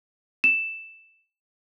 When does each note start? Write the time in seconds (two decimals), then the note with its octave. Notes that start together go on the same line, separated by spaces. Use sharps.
0.44 E7